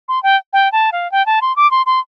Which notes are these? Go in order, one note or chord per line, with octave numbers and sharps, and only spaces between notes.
C6
G5
G5
A5
F5
G5
A5
C6
D6
C6
C6